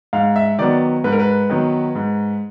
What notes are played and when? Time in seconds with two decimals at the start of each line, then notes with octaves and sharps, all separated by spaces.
0.13 G#2 F5
0.36 E5
0.58 D#3 F#3 B3 D5
1.04 G#2 B4
1.12 A#4
1.20 B4
1.50 D#3 F#3 B3
1.95 G#2